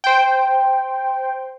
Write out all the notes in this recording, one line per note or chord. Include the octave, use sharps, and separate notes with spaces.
C5 G5